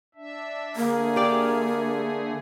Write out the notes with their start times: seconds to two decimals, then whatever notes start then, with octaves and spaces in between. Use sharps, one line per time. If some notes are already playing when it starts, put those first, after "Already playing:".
0.15 D4 E5
0.76 D3 A3 A#3 G#4
1.16 G4 D5